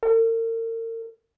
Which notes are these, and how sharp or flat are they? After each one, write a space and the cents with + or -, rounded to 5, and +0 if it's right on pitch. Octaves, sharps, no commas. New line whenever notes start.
A#4 -40